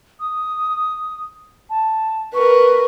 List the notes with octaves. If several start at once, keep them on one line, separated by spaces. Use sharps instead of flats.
D#6
A5
A#4 B4 C#6